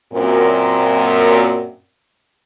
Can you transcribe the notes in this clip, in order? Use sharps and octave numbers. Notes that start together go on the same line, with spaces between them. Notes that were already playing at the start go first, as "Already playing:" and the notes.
F#2 A#2 C4